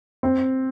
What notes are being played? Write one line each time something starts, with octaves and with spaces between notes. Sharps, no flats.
C4